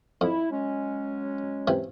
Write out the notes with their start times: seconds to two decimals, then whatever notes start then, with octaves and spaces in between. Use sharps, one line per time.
0.21 F2 E4
0.50 F#3 G#3 C#4
1.67 C3 E3